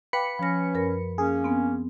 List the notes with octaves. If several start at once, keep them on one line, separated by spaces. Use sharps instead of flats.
B4 F5 G5 B5 D6 C#7
F3 C#4 A#6
F#2 A#4 A#6
A#3 C#4 G#4
B3 C4